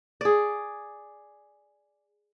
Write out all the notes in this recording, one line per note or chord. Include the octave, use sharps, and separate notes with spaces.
G#4 D5